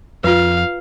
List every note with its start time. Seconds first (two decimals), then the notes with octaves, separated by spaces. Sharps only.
0.24 F2 F4 B4 F5